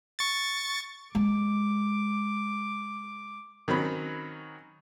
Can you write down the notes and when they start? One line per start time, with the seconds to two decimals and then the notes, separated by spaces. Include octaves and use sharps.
0.19 C#6 A6
1.15 G#3 D6
3.68 D#3 F#3 C4 C#4 B5